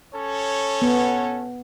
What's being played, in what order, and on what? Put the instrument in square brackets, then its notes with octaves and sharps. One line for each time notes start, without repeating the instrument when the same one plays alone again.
[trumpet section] C#4 A4 C#5
[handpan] B3